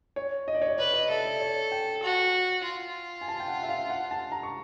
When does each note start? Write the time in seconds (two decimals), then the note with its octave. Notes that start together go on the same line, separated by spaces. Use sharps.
0.16 C#5
0.48 D#5
0.54 D5
0.62 C#5
0.68 D5
0.78 B4 D5
0.94 D#5
1.10 A4 E5
1.25 D5
1.40 C#5
1.72 G5
2.03 F#4
2.65 F4
3.21 G#5
3.28 A5
3.40 G5
3.48 F#5
3.63 E5
3.69 F5
3.90 F#5
4.11 A5
4.32 A#5
4.43 C#6